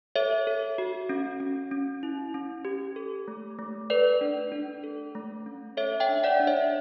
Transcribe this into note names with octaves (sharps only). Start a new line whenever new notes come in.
A4 C#5 E5
A4
F#4
C#4
C#4
C#4
E4
C#4
G4
A4
A3
A3
A4 B4 D5
D4
D4
A4
A3
C#4
A4 C#5 E5
E5 G5
D4
D5 F#5
D4
C#5 E5